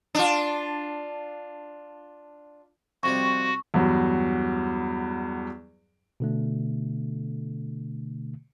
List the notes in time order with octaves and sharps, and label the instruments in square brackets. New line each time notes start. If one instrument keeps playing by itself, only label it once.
[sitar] D4 F4
[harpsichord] F2 C3 G3 [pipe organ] F#4 [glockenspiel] C#6
[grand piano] E2 G2 F#3
[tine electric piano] B2 D3 A3